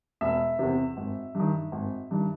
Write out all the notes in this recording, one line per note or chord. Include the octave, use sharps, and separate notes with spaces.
E1 E5
E2 C3
G#1
G2 D#3
G#1
G2 D#3